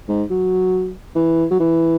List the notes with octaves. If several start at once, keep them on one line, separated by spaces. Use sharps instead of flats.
G#2
F#3
E3
F#3
E3